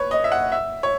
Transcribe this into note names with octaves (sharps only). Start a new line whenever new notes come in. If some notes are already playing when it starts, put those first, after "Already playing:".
Already playing: B4 C#5
D#5
E5
F#5
E5
C#5